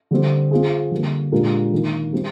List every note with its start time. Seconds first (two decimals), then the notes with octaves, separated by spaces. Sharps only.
0.11 D3 G3 C4
0.51 C4 F4 G#4
0.91 D3 G3 A#3
1.32 A#2 G#3 D4 G4 A#4
1.72 D#3 A#3 D#4
2.13 G3 C4 G4